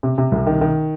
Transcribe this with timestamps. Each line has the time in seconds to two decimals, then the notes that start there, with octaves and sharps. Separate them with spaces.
0.03 C3
0.18 C3
0.32 C2
0.46 D#3
0.61 D#3